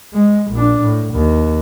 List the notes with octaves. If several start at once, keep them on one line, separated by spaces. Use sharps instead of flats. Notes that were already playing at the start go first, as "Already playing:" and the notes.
G#3
A#1 D4
A2
D#2